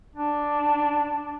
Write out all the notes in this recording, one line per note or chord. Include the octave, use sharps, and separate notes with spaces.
D4